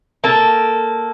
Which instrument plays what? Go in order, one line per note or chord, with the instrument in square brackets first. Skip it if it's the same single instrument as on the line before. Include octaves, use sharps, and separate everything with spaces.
[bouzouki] A#3 A4